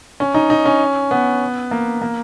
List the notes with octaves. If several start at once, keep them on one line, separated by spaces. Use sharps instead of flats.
C#4
D#4
D#4
C#4
B3
A#3
A#3